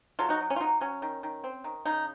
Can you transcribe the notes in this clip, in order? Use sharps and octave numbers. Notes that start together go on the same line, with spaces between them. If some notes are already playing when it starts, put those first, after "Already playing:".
F#3 F4 A4
D#4 F#4
F#3
C#4
F4
F#3 D#4
F#3 C#4
D#3
D#3
C4
D#3
C#3 D#4